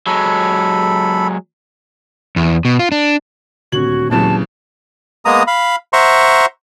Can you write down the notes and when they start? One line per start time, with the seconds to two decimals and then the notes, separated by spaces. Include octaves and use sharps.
0.07 F#3 G#3 A4 B5
2.36 E2
2.65 B2
2.79 F4
2.92 D4
3.72 D#1 D2 C4 F#4 G#6 F#7
4.11 D#2 A#2 C#3 E3 F#3 A5
5.25 G#3 A#3 B3 A#5 D#6
5.47 F5 B5
5.93 C5 E5 F#5 A#5 C6 C#6